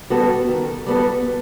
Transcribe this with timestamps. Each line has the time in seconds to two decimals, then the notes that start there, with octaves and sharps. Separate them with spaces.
0.10 G3 B3 F#4 A4
0.48 D#3
0.86 G3 B3 F#4 A4